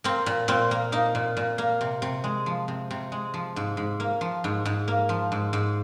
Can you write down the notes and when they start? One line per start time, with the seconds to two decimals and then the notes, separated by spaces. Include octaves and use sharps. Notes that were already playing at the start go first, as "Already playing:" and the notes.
0.04 A#3 C4
0.26 A#2
0.48 A#2 C4
0.71 A#3
0.92 A#3 D#4
1.15 A#2
1.37 A#2
1.58 A#3
1.81 C3
2.02 C3
2.24 G#3
2.46 F3
2.68 C3
2.91 C3
3.12 G#3
3.34 F3
3.56 G#2
3.77 G#2
4.00 A#3
4.21 F3
4.44 G#2
4.65 G#2
4.88 A#3
5.09 F3
5.32 G#2
5.53 G#2